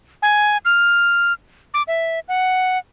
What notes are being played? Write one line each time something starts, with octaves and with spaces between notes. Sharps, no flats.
G#5
F6
D6
E5
F#5